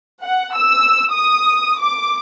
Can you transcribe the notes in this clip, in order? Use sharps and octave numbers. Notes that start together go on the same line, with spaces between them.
F#5
E6
D#6
D6